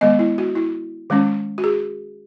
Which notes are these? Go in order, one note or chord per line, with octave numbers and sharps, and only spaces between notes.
D#3 G#3 B3 D#5
E4
F#4
E4
D#3 G#3 C#4
F#4
G#4